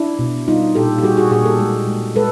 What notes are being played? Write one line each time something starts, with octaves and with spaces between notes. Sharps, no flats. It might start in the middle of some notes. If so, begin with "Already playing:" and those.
Already playing: D4 E4
B2
G3 D#4 F4
A#2 G4 A4
G4
G3 F#4 G#4
F#4 G#4
A#2 F#4 G#4
G4 A4
G#3
G#3
G#3 A4 B4